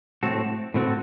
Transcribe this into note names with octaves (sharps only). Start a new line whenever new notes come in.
A2 A3 C4 F#4 A4
A2 A3 C4 F#4 A4